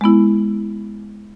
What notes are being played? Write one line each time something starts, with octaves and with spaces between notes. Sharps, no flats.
G#3 B3 E4